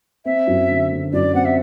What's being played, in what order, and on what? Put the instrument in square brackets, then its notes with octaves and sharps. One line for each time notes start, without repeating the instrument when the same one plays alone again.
[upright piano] C4 [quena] E5
[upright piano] F#2
D3
D3
[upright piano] F#2 [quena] D5
[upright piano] C4 [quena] F#5
[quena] E5